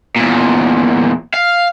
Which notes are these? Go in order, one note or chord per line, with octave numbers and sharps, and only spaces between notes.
E2 A#2
F5